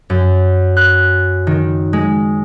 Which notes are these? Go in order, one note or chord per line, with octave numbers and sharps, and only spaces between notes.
F#2
F#6
D#3
G#3